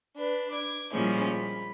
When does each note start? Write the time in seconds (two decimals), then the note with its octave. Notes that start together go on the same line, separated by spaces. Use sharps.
0.17 D4 B4
0.51 D6 G#6
0.91 A#2 F3 G3 G#3 C#4 E4
1.28 B5